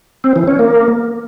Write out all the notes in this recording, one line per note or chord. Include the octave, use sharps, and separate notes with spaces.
C4
E3
C#4
A#3